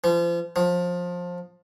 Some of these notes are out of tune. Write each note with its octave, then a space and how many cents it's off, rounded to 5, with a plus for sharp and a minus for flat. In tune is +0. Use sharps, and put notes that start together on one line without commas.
F3 -35
F3 +20